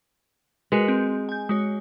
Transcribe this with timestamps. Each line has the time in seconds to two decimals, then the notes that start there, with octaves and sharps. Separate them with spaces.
0.72 G#3 F#4 A#4 B4
0.88 C4
1.29 G#5 G6
1.49 G#3 F#4 C#5